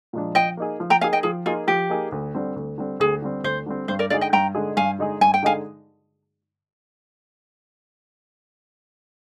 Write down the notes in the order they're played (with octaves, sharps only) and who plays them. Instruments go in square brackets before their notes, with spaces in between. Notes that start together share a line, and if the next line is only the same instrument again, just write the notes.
[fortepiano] A#2 F3 G#3 D4
[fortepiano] F3 [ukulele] D#5 G5
[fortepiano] A#3 D#4 G#4
F3
[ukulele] G5 A#5
[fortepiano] A#3 D#4 G#4 [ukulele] F5 G#5
[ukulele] D#5 G5
[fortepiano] F3 [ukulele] G#4
[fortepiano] A#3 D#4 G#4 [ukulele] F4
[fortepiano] F3 [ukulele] G4
[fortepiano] A#3 D#4 G#4
D2
D3 G3 C4
D2
D3 G3 C4
[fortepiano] D2 [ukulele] G#4
[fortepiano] D3 G3 C4
[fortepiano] D2 [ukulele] C5
[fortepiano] D3 G3 C4
[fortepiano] G2 [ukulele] C5
[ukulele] A#4 D5
[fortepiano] D3 G#3 D#4 G#4 [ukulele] D5 F5
[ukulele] D#5 G5
[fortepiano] G2 [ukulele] G5 A#5
[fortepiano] D3 G#3 D#4 G#4
[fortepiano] G2 [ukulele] F5 G#5
[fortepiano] D3 G#3 D#4 G#4
[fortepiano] G2 [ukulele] G#5
[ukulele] G5
[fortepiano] D3 G#3 D#4 G#4 [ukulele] F5 G#5